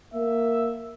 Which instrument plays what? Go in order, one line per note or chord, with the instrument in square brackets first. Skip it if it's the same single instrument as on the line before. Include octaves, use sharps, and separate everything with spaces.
[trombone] A#3 [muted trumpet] E5